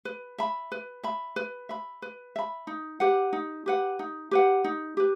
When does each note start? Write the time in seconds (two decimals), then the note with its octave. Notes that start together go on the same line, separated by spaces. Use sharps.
0.05 B4
0.38 E5 B5
0.72 B4
1.03 E5 B5
1.36 B4
1.69 E5 B5
2.02 B4
2.36 E5 B5
2.67 D#4
3.00 G4 B4 F#5
3.33 D#4
3.66 G4 B4 F#5
3.99 D#4
4.31 G4 B4 F#5
4.64 D#4
4.97 G4 B4